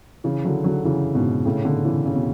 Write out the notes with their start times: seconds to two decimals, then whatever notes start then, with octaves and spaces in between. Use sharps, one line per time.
0.24 C#3 E3
0.45 D3 F#3
0.64 D3 F#3
0.84 C#3 E3
1.15 G#2 B2
1.46 A2 C#3
1.65 B2 D3
1.85 C#3 E3
2.06 C#3
2.15 B2